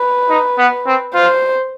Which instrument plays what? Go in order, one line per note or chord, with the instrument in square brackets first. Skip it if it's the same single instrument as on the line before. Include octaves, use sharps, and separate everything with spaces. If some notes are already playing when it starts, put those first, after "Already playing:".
Already playing: [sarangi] B4
[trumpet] D#4
B3
C4
[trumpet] F4 [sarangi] C5